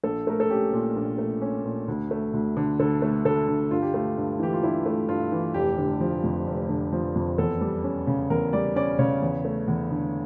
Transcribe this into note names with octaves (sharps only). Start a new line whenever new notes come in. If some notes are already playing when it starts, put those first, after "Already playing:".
A#1 A4
A3 A#4
A4
C#4 G4
A#2
A#1
A3
C#4
A#2
D2
A3
D2
D3
D2 A4
A3
D2 A4
D3
G2 F4
G4
A3 F4
G2
E3 G4
F4
G2 E4
A3
G2 F4
E3
F1 G4
D3
F3
F2
F1
D3
F3
F2
E2 A4
G3
C#4
C#3
E2 A#4
G3 D5
C#4 D5
C#3 C#5
E2
A3
E2
D3